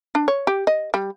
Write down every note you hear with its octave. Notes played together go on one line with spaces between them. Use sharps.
D4
C#5
G4
D#5
G3